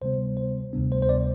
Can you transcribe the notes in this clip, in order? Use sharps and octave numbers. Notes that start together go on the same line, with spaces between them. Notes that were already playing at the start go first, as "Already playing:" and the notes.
D2 C3 G3 B3 C5
C5
D2 C3 G3 B3 D4
C5
C5
D5